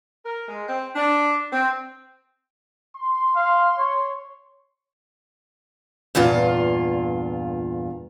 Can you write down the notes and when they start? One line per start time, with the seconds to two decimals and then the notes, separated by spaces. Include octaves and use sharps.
0.25 A#4
0.48 G#3
0.68 C4
0.95 D4
1.53 C4
2.96 C6
3.36 F5
3.78 C#5
6.15 E2 G2 A#2 F4